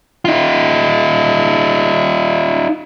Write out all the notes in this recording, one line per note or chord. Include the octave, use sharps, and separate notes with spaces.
D#4 F4